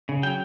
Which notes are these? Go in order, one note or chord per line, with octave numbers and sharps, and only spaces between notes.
C#3
F#3 G5